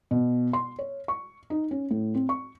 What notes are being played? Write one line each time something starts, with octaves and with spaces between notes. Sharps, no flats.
B2
C6
C#5
C#6
D#4
C#4
A2
C4
C#6